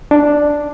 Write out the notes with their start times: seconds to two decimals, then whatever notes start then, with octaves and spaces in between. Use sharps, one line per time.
0.11 D4